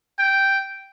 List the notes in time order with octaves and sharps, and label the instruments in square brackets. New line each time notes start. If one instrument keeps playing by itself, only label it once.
[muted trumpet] G5